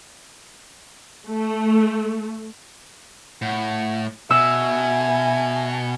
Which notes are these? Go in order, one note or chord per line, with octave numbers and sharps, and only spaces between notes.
A3
A2 F#5
B2 E5 G#5 E6